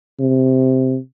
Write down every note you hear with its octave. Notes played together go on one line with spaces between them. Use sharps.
C3